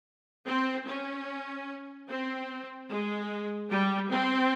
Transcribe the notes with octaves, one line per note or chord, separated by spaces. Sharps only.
C4
C#4
C4
G#3
G3
C4